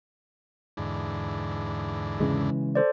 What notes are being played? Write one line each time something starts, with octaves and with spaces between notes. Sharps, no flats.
E2 G#2 D3
C#3 E3 G#3
A4 C5 D5